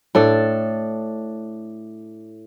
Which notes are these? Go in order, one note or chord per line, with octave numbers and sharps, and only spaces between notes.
A2 D4 A4